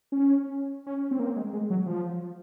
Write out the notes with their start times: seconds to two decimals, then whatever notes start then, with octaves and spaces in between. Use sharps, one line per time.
0.12 C#4
0.86 C#4
1.11 C4
1.19 A#3
1.27 C4
1.36 G#3
1.53 G#3
1.70 F#3
1.86 F3